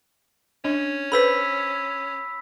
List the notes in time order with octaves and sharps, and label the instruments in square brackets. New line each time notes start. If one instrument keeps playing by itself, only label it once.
[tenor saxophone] C#4 [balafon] D4 D#5
[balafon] A4 B4 C5 [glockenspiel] B5 E6 B6